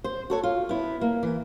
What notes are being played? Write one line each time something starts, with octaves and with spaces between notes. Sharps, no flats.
C5
F#4 A4 C#5
F4
B3 E4
A#3
E3